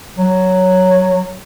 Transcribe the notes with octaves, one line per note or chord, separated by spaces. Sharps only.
F#3